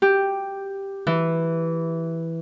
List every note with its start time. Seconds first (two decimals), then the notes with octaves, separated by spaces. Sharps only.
0.02 G4
1.07 E3